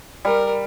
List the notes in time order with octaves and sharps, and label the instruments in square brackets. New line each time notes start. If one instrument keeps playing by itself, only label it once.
[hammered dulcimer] G3 [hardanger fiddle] A#4